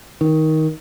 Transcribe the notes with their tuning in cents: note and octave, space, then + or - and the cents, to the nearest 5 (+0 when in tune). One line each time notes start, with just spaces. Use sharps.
D#3 +15